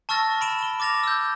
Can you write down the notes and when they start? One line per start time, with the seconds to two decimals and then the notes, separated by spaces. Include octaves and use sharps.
0.09 A5 C#6 E6 F6 A6 A#6
0.41 B5 D7 E7
0.63 G7
0.80 D6 F6 A6 A#6 F7
1.04 E6 G6